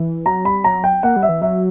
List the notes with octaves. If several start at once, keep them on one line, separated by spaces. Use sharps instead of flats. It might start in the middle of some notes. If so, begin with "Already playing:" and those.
Already playing: E3
F#3 A#5
G3 B5
F#3 A#5
G5
A#3 F#5
G3
E5
E3
F#3 E5